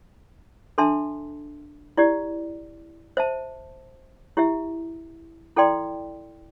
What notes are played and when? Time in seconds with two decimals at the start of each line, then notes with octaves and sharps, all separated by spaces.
0.78 D4 A4 E5 A5 C6
1.97 E4 G4 D5
3.17 C5 E5 A5
4.37 E4 G4 E5
5.56 E4 A4 D5 G5 C6